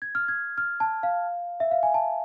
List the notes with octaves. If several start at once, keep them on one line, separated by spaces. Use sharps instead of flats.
G#6
F6
G#6
F6
A5
F5
E5
F5
G#5
A5